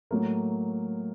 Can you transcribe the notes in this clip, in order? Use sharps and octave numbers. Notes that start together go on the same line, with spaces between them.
A2 F#3 A3 A#3